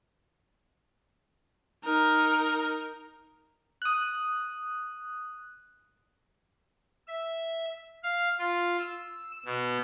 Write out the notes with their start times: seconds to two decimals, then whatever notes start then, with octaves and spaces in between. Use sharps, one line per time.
1.84 D#4 A#4
3.82 D#6 F#6
7.08 E5
8.03 F5
8.38 F4
8.80 E6
9.46 B2